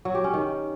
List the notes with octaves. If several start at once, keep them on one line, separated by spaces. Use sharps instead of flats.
F#3
G4
C#4
D#3